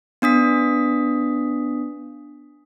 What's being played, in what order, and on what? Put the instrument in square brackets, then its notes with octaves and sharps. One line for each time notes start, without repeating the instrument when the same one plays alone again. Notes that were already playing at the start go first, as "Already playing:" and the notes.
[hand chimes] B3 D4 D#6 B6